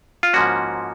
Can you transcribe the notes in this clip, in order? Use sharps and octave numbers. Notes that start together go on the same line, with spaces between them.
F4
G#2 F3 A#3 C#4 F#4